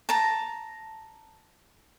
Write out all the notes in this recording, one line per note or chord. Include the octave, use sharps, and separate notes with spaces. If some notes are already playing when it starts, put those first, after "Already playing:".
A5 A#5